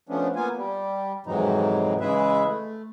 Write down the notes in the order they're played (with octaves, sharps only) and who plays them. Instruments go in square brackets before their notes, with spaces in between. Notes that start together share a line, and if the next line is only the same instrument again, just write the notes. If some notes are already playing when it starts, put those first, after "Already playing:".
[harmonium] F3 A3 B3 C#4 D4
A#3 B3 F4 G#5
G3
F2 G#2 C3 E3 F#3 D#4
C#3 E3 G#3 G#4 B4 E5
A3